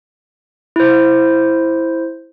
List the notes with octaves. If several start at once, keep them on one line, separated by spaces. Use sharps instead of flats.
E4 C5